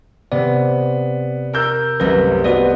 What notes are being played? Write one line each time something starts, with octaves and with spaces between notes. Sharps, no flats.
C3 B3 D5
A#4 E6 G6
C2 F#2 A3 A#4 B4 A#6
B3 F#4 B4 D5 D#5